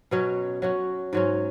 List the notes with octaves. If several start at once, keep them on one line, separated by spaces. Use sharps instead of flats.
B2 F#3 C#4
F#3 C#4 F#4
G#2 F#3 C#4